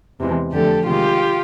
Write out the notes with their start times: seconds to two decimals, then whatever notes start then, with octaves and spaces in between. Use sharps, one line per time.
0.19 E2 C3 E3 G#3
0.52 F2 D3 F3 A3 G4 A4
0.86 C3 D#3 G#3 F4 G4